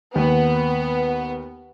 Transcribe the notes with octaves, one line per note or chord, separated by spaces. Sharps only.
D#2 B3 B4